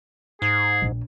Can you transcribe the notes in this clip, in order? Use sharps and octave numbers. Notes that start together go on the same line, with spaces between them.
G#2 G#4
A#1